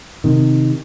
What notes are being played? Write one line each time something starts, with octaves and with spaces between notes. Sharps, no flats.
C3 D#3